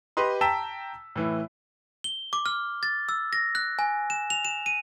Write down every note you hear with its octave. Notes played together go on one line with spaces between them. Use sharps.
G4 B4 D#5 C6
G5 A5 A#5 E6 B6 E7
A2 E3
G7
D6
F6
A6
E6
A#6
F#6
G#5
E7
F7
E7
D#7